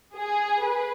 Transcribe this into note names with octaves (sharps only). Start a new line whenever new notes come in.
G#4
B4